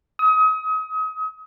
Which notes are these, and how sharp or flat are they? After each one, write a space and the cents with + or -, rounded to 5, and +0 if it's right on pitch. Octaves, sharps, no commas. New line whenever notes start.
D#6 +35